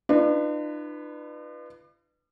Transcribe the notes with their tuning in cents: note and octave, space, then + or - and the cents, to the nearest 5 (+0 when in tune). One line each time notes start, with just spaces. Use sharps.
D4 +45 F4 -45 B4 +0